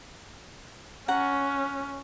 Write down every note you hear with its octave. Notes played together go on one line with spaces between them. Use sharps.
C#4 F#5 A#5